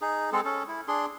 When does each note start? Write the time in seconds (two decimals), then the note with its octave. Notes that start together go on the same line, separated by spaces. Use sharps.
0.01 D#4 G#4
0.33 G#3 C4 G#4 A4
0.45 C#4 A4
0.68 E4
0.88 D4 G#4 C6